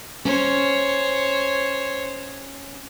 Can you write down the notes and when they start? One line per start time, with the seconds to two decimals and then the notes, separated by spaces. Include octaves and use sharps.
0.25 C#4 C5 C#5